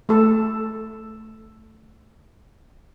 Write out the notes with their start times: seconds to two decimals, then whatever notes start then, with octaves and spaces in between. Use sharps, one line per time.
0.09 A3 A4